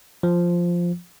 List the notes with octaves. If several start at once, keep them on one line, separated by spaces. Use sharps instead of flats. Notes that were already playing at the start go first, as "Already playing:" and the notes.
F3